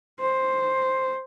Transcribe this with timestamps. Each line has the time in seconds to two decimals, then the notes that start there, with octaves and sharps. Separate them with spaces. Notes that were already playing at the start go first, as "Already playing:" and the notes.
0.20 C5